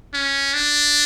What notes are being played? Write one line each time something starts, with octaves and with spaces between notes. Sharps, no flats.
C#4
D4